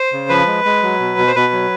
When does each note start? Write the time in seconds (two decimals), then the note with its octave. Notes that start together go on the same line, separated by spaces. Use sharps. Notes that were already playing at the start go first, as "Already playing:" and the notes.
Already playing: C5
0.13 C#3
0.29 F3 B4
0.47 G#3
0.65 G#3
0.83 F#3
1.00 B2
1.18 B2
1.27 C5
1.35 B2 B4
1.53 F#3